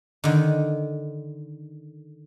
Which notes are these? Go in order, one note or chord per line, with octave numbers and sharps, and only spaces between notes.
D3 D#3